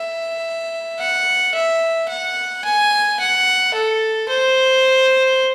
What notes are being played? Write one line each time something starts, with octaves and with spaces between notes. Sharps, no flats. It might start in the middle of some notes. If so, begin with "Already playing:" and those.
Already playing: E5
F#5
E5
F#5
G#5
F#5
A4
C5